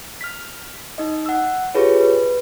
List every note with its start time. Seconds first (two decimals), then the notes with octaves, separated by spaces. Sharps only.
0.21 F6 B6
0.98 D#4 D#5
1.26 F#5 E6
1.74 F4 G4 G#4 B4 C#5
2.01 B4